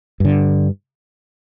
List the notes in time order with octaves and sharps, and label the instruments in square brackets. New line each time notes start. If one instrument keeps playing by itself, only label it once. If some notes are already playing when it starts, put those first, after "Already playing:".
[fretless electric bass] G2 D3